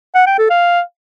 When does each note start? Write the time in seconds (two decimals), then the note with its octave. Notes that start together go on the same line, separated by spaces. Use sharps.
0.15 F#5
0.26 G5
0.38 A4
0.50 F5